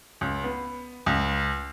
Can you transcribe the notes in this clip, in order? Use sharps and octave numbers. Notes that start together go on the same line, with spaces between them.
C#2
B3
C#2